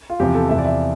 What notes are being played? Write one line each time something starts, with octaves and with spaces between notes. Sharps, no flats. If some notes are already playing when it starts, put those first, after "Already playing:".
F4
E2 C3 F3 G4
A4
E2 C3 F3 E5
D5
E5